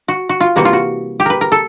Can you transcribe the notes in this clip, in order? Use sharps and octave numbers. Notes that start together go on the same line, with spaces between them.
F#4
F#4
F4
C3 E3 G3 A#3 F#4
F4
F#4
G4
A#4 B4
A#4
A4